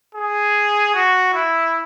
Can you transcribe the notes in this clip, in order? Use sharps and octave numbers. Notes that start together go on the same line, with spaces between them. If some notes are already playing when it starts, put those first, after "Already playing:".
G#4
F#4
E4